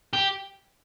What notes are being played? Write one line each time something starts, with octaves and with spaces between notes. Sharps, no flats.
G4